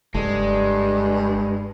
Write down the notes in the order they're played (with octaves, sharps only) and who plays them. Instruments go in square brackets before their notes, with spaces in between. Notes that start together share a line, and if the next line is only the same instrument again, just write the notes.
[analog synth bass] F#1 [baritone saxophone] G2 [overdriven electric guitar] G#3 [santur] A4 D5